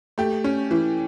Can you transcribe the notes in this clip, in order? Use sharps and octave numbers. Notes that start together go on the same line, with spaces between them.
A3 G4
C#4
E3